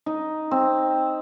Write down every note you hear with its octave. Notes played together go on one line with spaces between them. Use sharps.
D#4
C4